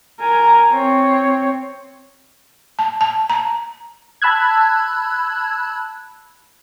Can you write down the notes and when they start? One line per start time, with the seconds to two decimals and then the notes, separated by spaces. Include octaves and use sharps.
0.20 A#4 G#5
0.70 C4 C#5
2.79 A5
3.01 A5
3.30 A#5
4.22 A5 B5 E6 F#6 G#6